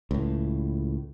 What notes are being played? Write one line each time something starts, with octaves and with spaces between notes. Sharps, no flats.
C#2 A2